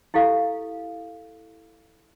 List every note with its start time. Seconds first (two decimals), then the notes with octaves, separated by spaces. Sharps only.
0.14 E4 G4 A4 F5